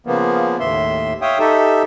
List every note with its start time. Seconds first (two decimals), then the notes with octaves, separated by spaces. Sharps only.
0.07 C#3 F3 A#3 B3
0.60 D#2 A2 E5 C6
1.22 C#5 E5 F5 G5 D#6
1.39 D#4 G4 A4 E5